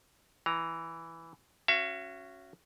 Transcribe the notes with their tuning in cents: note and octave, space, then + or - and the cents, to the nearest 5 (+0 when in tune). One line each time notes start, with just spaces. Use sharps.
E3 +0 A#5 +0
C#4 +0 F#4 +0 E5 +40